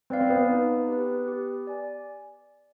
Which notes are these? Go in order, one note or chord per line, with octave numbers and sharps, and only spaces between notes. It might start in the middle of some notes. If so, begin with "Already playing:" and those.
C4 B4 D5 F5
C4
B3
D#4
G4 B4
G4
D5 G#5